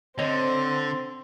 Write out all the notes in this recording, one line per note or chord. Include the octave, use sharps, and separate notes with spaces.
D3 C4 C5 C#5 D#5